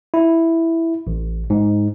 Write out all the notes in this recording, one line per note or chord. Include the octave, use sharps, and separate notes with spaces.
E4
A1
G#2